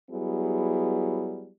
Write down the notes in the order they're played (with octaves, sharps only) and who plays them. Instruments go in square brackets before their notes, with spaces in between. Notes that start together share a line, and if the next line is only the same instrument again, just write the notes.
[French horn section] F#3 G3 B3 E4 G#4